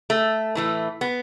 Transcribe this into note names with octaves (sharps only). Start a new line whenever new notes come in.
A3
A2 E3 A3
B3